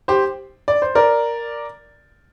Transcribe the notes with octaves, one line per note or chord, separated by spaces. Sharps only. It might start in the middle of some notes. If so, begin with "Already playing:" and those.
G4 C5
D5
C5
A#4 D5